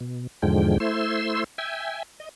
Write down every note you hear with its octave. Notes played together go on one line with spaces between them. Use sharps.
B2
E2 G#2 D3 F3 G#3 G5
A3 E4 C5 C6 E6
E5 G5 G#5
D#5